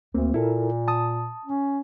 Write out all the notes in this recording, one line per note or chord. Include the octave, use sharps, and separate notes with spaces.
D2 A#3 C4
A#2 E4 A4 A#4
A5 D#6
C#4